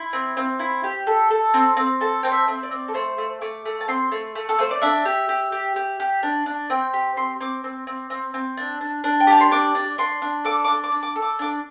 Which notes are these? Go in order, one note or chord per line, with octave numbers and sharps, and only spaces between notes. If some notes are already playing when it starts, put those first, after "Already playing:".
Already playing: E4 C6
C4
C4
E4
G4
A4
A4
C4
C4
A4 A5
C4 G5
E5
C4
D5
C4
A4
A3 C5
A3
A3 D6
A3
A5
C4 C6
A3
A3
A4
A3 C5
D5
D4 E5
G4
G4
G4
G4
G4
D4
D4
C4 G5
G4
C4 C6
C4 D6
C4
C4
C4
C4
D4
D4
D4
G5
G4 A5
C6
D4 D6
D4
D4 C6
D4
A4 D6
D4 D6
D6
D4
D6
A4
D6
D4 D6